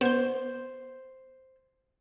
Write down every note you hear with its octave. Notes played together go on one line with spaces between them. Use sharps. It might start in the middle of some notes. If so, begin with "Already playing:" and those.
B3 C5 G6